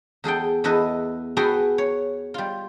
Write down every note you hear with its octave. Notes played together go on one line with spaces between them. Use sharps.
E2 G#4 A4 G5
E2 E4 A4 B4 D#5
F#4 G#4 A4 B4 G5 G#5
C#5
G3 F4